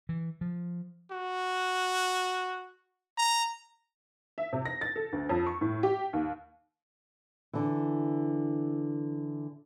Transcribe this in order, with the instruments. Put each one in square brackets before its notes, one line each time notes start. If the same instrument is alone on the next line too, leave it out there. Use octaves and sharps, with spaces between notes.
[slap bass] E3
F3
[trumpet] F#4
A#5
[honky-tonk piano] E5
C3
A#6
A6
A4
D2
F2
C#6
A2
G4
D#2
[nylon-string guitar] D3 E3